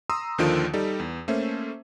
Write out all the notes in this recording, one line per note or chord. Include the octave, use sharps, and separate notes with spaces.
A#5 C6 D#6 E6
D#2 D3 D#3 F3 F4 D7
G3 D#4 A4
E2
A3 A#3 C#4 C5 E5